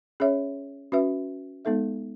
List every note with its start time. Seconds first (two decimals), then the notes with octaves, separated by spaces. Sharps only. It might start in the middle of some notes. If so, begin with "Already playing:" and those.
0.20 C#4 G#4 C#5 E5
0.92 C#4 F#4 B4 E5
1.65 G#3 B3 D#4 A4 E5